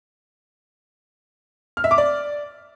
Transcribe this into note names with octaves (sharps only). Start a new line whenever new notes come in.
F6
E5
D6
D5